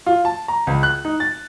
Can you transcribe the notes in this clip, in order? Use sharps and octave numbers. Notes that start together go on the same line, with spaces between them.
F4
A5
A#5
C#2
F#6
D#4
A6